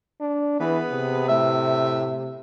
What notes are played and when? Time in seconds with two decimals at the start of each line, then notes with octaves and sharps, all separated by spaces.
0.21 D4
0.60 E3 B3 G#4 B4
0.92 C3
1.28 A2 E5